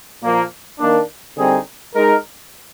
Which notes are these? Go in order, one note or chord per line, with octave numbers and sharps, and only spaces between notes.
A#2 F3 A#3
D#3 A#3 D4
D3 G3 C4 D#4 G#4
G#3 D#4 A#4